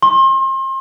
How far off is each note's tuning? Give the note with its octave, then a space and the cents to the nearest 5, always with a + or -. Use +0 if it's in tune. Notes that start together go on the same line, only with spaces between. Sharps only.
C6 +35